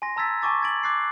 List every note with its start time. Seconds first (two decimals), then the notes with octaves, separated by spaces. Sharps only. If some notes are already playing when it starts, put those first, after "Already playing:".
0.02 G#5 C6 A#6
0.16 A5 A#5 E6 G#6 A6 B6
0.42 G#5 A5 C#6 D6 A6
0.62 G#6 A6 B6 D7 F#7
0.83 D6 F#6 A6 C7